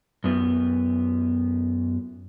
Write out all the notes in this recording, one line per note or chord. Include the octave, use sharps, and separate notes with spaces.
F#2 B3